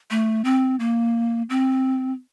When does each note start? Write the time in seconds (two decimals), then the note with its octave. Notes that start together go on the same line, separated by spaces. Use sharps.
0.11 A3
0.44 C4
0.80 A#3
1.50 C4